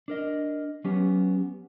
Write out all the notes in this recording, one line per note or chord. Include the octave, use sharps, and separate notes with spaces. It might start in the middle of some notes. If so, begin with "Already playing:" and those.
D4 A#4 D#5
F#3 B3 C#4 G4